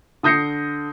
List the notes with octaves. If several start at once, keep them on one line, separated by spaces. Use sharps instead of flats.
D3 D#6 G6 A#6 C7 C#7